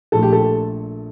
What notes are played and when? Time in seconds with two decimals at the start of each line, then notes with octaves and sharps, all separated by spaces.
0.12 A#1 A#2 A3 A4
0.23 G4
0.32 A4